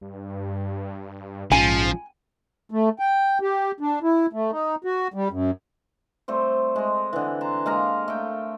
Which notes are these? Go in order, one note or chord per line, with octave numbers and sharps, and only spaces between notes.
G2
A#1 G#2 F3 C#4 G#5
A3
G5
G4
D4
E4
A3
D#4
F#4
G3
F#2
G3 A3 C4 C5
G#3 D#5
D3 E3
A5 A#5 C6
G#3 A#3 F5 A#5
A3 G5